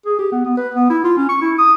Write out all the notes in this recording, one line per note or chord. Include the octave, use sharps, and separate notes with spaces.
G#4
G4
B3
B3
B4
B3
E4
F4
C#4
C#6
E4
D#6